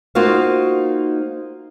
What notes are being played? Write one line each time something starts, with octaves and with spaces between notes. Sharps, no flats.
A#3 D#4 F4 F#4 C5 F5